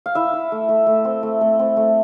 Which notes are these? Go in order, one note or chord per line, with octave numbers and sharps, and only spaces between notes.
F5
E4 E5
E4
A3
A3
A3
C4
A3
A3
C4
A3